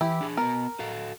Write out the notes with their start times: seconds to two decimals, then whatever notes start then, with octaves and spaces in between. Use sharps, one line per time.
0.01 E3 E4 G4
0.21 D4 G#4
0.37 B3 F#4 A#4
0.79 F#4 A4 F5